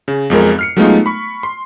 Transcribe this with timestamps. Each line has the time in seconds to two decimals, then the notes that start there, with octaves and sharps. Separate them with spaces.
0.08 C#3
0.30 B1 F2 G#3 A#4
0.59 F6 C7 C#7
0.77 F#3 G#3 A3 B3 D#4 F4
1.06 B5 C#6
1.43 C6